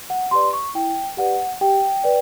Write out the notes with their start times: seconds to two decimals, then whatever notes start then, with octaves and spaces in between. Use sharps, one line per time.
0.10 F#5
0.31 G4 B4 D5 C6
0.53 C#6
0.75 E4 G5
1.17 G4 B4 D5 F#5
1.61 G4 G5
2.04 B4 D5